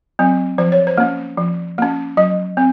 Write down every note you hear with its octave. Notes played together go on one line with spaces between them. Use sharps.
F#3 C4
F3 C5
C#5
C5
A#3 C#4
F3
A#3 C#4
F#3 D#5
C4